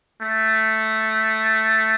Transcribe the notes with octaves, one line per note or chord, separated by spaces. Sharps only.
A3